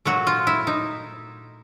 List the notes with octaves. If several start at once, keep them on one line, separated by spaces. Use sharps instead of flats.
A#2 F#3 A3 F#4
F4
E4
D#4